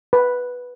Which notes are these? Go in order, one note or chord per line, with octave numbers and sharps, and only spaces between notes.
B4